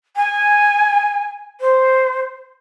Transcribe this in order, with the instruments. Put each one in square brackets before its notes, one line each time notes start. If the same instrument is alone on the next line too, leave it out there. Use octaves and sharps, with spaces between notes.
[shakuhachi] G#5
C5